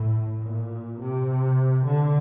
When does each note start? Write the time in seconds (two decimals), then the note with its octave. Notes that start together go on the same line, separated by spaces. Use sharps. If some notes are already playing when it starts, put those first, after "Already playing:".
Already playing: A2
0.43 A#2
1.00 C3
1.86 D3